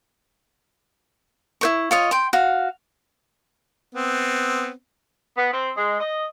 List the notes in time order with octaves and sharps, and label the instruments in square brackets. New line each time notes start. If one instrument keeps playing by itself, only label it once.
[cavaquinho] E4 C5 C#6
F4 C#5 D#5
G5 C6
F#4 F5
[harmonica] B3 C4
[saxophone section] B3
C4
G#3
D#5